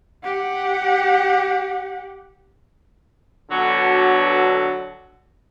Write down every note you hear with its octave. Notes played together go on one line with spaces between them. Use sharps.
G4 F#5
B2 D3 F#3